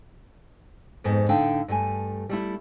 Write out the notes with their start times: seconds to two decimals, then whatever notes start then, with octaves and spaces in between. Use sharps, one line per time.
1.04 F2 G#2 B3
1.29 A2 D3 D4 D#4 F5 G5
1.68 G2 A3 G#5
2.29 G3 A3 E4